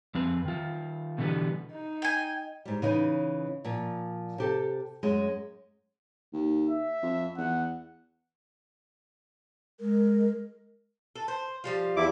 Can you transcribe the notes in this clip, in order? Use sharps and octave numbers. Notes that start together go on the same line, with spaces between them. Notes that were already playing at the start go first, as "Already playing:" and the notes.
F2 C4 B4
D#3 F4
B2 D3 E3 G3 B3
D#4
G5 G#5
G#2 G3
C#3 E3 D#4
A#2 F3
C3 G4 A4
F#2 G#3
D#2
E5
F2
E2 F#5
G#3 A#4
A4
C5
F3 G3 F4
E2 E4 D6